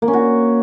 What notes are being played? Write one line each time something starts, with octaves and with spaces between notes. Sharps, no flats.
A#3
C#4
F#4